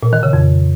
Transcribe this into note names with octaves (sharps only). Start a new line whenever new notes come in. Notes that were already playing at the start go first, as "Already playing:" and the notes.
A#2
D#3
C#3
F2